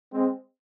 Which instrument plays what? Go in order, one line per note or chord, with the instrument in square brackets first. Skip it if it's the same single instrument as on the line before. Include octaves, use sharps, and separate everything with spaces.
[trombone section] G#3 C4